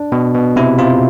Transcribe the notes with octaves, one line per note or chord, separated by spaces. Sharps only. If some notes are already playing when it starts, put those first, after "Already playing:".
Already playing: D4
B2
B2
C3 E4
C3 F4